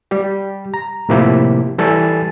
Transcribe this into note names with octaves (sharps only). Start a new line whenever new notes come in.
G3 G4
A#5
A2 C3 F3 A#3 E4 G4
E3 G3 A4 G#5 A6